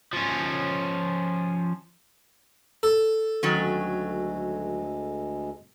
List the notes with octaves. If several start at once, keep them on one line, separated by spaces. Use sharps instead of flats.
F3 C#4
A4
D2 D#3 F#3 G#3 C#4